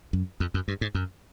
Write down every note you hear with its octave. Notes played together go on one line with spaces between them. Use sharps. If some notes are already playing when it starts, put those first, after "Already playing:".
F#2
F2
F#2
G2
G#2
F#2